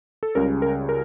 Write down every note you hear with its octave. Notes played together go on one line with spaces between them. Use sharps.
A4
C#2 C#3 G3 C#4 A#4
A#4
A#4